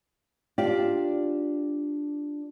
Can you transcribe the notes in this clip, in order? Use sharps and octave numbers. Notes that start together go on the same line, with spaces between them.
D4 F4 G4 D5